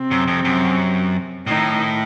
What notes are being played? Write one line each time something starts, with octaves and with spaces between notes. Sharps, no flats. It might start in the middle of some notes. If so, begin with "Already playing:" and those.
Already playing: C3 C4
F#2
F2
F#2
A2 D#3 D#4